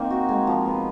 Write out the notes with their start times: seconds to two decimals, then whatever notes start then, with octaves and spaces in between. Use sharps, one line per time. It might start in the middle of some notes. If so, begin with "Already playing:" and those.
Already playing: A#3 C4 D#4
0.10 F#4
0.29 G#3
0.47 F3
0.66 B3